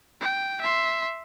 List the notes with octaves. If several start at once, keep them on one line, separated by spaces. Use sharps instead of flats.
G5
E5 C6